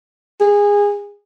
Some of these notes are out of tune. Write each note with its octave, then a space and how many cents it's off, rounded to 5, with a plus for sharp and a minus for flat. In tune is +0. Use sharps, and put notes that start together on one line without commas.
G#4 -20